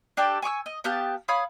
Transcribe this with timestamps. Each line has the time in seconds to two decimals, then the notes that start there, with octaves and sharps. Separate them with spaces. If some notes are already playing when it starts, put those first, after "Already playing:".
0.17 D4 G4 A4 D5
0.42 G#5 C#6 D6 E6
0.66 D#5
0.84 B3 G4 F5 A5
1.28 C#5 F5 B5 D#6